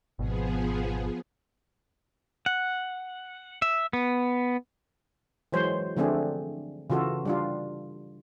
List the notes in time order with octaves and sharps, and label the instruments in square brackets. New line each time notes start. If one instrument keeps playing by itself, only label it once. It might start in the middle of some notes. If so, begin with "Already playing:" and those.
[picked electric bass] G#1 B2 [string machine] F3 B3 G#4
[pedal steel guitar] F#5
E5
B3
[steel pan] E3 F#3 G#3 C5 C#5
D3 F3 A3 C4 D4 G#4
C#3 E3 F4 F#4 A4
G3 D4 F4